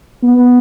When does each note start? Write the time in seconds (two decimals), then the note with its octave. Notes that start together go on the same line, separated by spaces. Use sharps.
0.23 B3